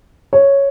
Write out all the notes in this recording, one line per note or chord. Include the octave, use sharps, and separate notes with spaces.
C#5